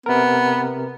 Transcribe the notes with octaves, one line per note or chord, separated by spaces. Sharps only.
C3 B3 A#4